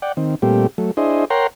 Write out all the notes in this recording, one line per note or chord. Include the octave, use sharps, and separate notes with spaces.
D5 F#5 G5
D#3 C4
A#2 G3 A3 C4 G4
F#3 A3
D4 E4 G#4 C5 D#5
A#4 C#5 F#5 G5 A#5 C6